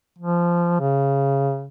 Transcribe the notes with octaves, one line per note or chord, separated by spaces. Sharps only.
F3
C#3